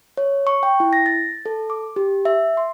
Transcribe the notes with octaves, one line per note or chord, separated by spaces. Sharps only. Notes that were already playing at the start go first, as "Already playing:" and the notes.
C#5
C#6
G5
E4
A#6
A6
A4
D6
G4
E5
C6